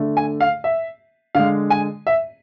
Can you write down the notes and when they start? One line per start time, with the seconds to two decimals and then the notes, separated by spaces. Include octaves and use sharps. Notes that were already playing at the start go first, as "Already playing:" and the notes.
Already playing: D3 A3
0.17 G#5
0.41 F5
0.64 E5
1.35 D3 G#3 F5
1.70 G#5
2.07 E5